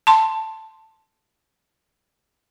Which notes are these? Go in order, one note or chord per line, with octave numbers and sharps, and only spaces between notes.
A5 C6